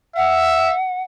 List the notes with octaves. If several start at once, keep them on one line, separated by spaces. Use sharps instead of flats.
E5 F#5